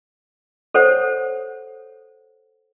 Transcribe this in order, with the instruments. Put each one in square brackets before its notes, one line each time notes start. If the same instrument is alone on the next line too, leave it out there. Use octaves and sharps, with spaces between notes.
[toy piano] A4 C5 C#5 F#5